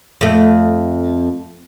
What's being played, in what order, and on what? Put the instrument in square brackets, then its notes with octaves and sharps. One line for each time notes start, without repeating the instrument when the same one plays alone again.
[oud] F2 A3